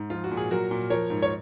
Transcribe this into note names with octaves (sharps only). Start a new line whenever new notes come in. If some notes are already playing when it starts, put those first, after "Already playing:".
Already playing: G#2
F3 F4
F#4
A#2
G#4
F#3 F#4 A#4
A#2
F3 A#4 C#5
G#2
C#5